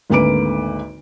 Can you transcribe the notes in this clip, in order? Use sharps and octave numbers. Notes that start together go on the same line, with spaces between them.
G#1 D2 A#3 B4 D6 D7